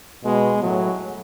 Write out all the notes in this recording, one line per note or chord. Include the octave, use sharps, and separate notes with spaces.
B2 G#3
A2 F#3